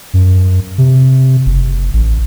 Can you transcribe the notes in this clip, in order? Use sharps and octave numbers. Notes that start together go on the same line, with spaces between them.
F#2
C3
F#1
A1